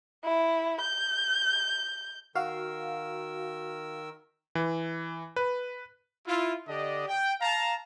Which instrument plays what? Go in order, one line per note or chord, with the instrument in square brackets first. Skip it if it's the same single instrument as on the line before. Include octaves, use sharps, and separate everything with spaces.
[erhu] E4
G6
[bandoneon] D#3 A#4 E6 [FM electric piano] F#4 F5
[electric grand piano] E3
B4
[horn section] E4 F4
D3 D4 G4 D5 D#5
G5
F5 A5 A#5